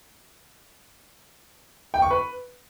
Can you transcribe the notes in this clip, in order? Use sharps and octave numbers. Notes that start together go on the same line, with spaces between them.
G5
C#6
B4